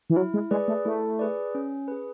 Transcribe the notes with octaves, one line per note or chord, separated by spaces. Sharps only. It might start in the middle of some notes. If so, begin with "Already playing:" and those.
E3
F#3 E4
G#3
G#3 G#4 B4 D5
A3
A3 E4
G#4 B4 D5
C#4
G#4 B4